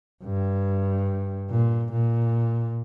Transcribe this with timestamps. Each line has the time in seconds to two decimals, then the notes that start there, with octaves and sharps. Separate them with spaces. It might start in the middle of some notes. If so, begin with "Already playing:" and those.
0.24 G2
1.50 A#2
1.92 A#2